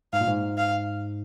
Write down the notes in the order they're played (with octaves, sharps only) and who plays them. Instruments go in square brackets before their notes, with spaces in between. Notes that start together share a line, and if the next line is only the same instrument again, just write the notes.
[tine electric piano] G#2 [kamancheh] F5
[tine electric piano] A#2
G#2
[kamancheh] F5